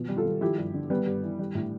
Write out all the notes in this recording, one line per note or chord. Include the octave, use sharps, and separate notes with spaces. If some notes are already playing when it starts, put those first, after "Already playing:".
Already playing: B2 F3
G3
F4 A4
G3
F3 E4 G4
G2
D3
G3 B3
G2
E3
G3
A2